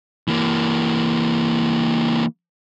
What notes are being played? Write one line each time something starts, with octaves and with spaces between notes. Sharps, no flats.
E3 A#3